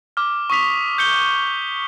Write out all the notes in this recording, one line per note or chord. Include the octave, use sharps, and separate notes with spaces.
D6 F6
C#6 D#6 B6 F7
G6 C#7 G7